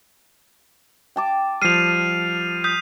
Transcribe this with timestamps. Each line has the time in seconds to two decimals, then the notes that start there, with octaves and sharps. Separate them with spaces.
1.16 G5 A5 D6
1.62 F3 G3 F6 C7 D#7 F7
2.64 D#6 G6 B6